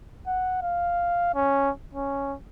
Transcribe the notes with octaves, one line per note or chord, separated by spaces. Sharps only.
F#5
F5
C#4
C#4